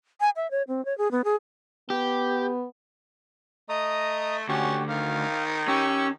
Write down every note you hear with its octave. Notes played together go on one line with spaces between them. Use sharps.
G#5
E5
C#5
C4
C#5
G#4
B3
G#4
B3 G4
A3 D#5 A#5 D#6
D2 C#4 F#4 G4
D#3 F5
C#4 G4 C#6 E6